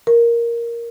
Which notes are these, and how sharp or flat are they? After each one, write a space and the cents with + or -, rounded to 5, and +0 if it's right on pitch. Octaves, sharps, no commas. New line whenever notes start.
A#4 +5